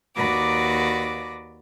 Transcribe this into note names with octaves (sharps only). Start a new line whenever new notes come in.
D#2 F#4 B4 D5 D6 A#6